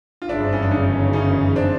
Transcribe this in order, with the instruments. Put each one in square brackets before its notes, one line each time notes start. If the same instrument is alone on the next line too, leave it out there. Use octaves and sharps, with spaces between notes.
[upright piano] F4
[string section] G1 F#2 C#3 E3 [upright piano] D4 E4
[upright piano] C4
C#4
D4
C#4 D#4
C#4 D#4
C4 D4